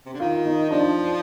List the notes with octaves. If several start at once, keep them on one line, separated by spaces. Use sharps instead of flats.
C3
D3
D#3 F4
D#4
F3 D4